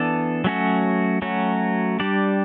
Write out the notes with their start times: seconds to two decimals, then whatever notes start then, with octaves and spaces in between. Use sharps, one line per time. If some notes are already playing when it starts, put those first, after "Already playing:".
Already playing: E3 B3 D4 A4 D5
0.44 F#3 A3 C#4 F#4
1.22 F#3 A3 C#4 F#4
2.00 G3 D4 G4 D5